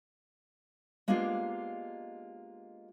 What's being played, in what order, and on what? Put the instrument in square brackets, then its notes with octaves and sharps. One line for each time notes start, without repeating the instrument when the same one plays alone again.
[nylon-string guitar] G#3 A#3 B3 D4 F4 G4